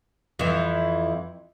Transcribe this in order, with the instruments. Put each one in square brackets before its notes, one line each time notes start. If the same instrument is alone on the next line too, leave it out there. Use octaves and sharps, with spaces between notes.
[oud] F2 E3